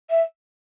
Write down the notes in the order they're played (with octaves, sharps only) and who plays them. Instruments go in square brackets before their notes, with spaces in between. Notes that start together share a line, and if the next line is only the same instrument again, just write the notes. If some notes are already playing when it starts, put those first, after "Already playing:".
[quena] E5